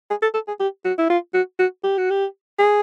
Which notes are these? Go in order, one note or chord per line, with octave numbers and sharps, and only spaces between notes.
G#4
A4
A4
G#4
G4
F#4
E4
F4
F#4
F#4
G4
F#4
G4
G#4